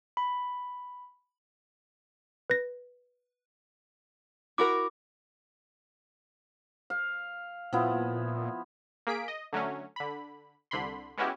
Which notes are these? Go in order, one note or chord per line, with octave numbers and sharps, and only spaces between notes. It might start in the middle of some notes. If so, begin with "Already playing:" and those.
B5
B4 A#6
E4 F#4 A#4 D6
F5
A#2 F3 B3 E4
A#3 G#4 B6 D7
D#5
D3 F#3 A3 C#4
D3 B5
C2 D3 B5 C6
G#3 B3 C#4 E4 F#4 G4